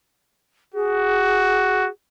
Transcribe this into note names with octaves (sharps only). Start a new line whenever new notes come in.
F#4 G#4